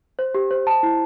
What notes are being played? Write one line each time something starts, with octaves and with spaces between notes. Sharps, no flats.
C5
G4
C5
A5
E4